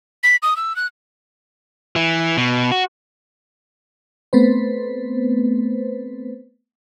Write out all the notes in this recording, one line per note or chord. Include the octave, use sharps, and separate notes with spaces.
B6
D#6
E6
F#6
E3
B2
F#4
A3 B3 C4 B4 C5